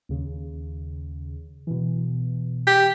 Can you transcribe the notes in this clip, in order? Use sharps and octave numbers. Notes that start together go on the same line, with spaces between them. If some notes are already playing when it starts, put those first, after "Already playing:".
D#2 C#3
B2 E3
G4